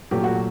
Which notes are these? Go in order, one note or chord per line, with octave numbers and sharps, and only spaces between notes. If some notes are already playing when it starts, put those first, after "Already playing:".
A#2 F#3 A3 G4
F#4